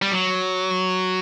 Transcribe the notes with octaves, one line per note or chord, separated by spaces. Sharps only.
G3
F#3